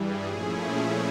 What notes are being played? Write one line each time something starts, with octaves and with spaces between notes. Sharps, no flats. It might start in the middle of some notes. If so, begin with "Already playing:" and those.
Already playing: G2 E3 G3 G#4
A#2 F3 A3 C#4 E4